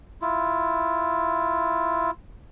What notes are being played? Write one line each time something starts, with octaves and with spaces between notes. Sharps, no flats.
E4 F4